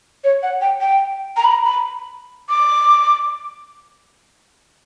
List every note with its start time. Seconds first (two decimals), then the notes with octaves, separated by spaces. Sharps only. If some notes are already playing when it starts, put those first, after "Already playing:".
0.24 C#5
0.43 F#5
0.61 G5
0.80 G5
1.37 A#5
1.44 B5
1.51 A#5
1.65 B5
2.49 D6